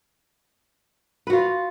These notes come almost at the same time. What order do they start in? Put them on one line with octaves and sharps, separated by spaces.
B4 F#4 F4